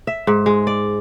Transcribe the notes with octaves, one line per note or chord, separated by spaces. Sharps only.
E5
G#2
G#3
D5